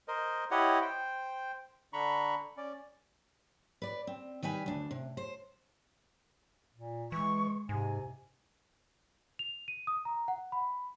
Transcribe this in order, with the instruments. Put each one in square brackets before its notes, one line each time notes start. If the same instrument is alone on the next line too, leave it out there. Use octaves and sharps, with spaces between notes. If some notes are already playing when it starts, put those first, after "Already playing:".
[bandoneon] A#4 C5 D#5
E4 G4 C#5 D#5 F#5
C5 G5
D3 D4 A#5 B5 C#6
C#4 D5
[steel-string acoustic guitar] B4 D5
C4
D#3 G3 B4 G#5
D2 D4
C3
C5
[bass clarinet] A#2
[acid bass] E3 [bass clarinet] G#3 [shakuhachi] C#6
[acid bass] G#2 [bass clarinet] C3 [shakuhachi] G#5
[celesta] F7
D#7
D#6
A#5
F#5
B5